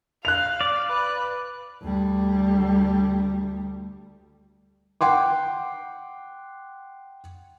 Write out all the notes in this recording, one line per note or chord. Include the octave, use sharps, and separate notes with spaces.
F5 F#6 F7
D5
B4
D2 G3
F#5 G5 C6 D6